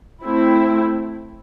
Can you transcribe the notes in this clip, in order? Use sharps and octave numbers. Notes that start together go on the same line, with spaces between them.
A3 C4 E4